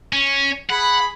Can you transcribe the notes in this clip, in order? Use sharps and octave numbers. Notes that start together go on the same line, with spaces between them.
C#4
G#4 F#5 B5